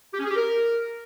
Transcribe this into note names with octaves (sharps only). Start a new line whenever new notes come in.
G4
C#4
G#4
G4
A#4